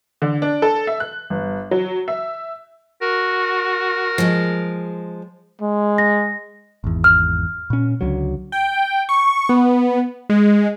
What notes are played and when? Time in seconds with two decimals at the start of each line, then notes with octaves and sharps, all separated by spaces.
0.22 D3
0.42 D4
0.62 A4
0.87 E5
1.00 F#6
1.30 G1
1.71 F#3
2.08 E5
3.02 F#4 A#4
4.18 F3 G#3
5.62 G#3
5.98 A#6
6.84 G#1 E2
7.04 F6
7.70 A#2 C#4
8.01 C#2 D3 F#3
8.52 G5
9.09 C#6
9.49 B3
10.30 G#3